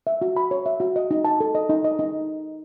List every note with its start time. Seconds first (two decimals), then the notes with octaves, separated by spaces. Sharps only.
0.07 E5
0.22 F#4
0.37 B5
0.51 C#5
0.66 E5
0.80 F#4
0.96 D#5
1.11 D#4
1.25 A5
1.40 A4
1.55 D#5
1.69 D#4
1.84 D#5
1.99 D#4